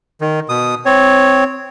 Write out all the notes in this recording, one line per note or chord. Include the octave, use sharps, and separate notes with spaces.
D#3
B2 D#6
C4 C#5